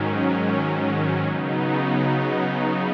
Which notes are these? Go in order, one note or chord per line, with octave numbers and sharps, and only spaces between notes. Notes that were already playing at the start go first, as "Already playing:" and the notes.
Already playing: G#2 D#3 F#3 C#4
C#3 F#3 B3 D#4